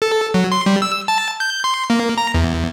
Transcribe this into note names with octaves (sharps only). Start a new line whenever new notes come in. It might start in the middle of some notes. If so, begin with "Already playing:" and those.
A4
F#3
C6
G3
E6
A5
G6
C6
A#3
A#5
E2